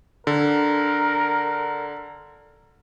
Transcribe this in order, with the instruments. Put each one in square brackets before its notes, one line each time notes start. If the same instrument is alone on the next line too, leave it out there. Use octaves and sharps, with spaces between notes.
[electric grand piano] D3 [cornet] A#4